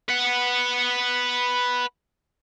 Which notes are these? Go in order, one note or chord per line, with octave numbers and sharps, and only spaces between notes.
B4 F#5